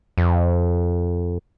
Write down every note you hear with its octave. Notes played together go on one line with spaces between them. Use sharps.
F2